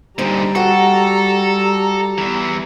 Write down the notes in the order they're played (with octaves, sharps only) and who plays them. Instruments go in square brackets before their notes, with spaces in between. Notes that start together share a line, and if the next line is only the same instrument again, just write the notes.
[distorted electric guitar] A#2 D3 [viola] G3 A#5 [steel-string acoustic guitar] D#4 C5
[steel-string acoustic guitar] F#4 F#5 G5 [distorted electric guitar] A4
[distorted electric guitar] E2 E3